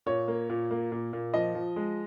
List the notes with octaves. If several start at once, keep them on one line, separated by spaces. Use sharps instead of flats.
A#2 C#5
A#3
A#2
A#3
A#2
A#2
F3 D#5
F3
G#3